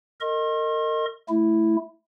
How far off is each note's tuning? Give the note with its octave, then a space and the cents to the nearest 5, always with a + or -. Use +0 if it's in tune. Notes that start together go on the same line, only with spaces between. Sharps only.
A#4 -35 D#5 +0 C6 +45
A3 +0 E4 +0